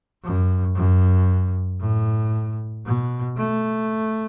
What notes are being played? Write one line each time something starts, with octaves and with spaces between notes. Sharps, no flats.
F#2
F#2
A2
B2
A3